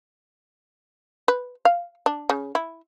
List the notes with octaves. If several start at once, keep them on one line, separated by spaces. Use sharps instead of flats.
B4
F5
D4
C#3
E4